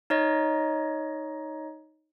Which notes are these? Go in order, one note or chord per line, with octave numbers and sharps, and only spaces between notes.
D#4 C#5 D#5